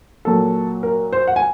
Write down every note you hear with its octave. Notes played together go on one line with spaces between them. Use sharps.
A#2 F#3 A#3 A4
A#4
C5
F#5
G#5